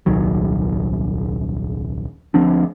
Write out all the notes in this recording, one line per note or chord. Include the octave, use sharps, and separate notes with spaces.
D#1 C2 D#3 F#3
D2 F3 C4 D4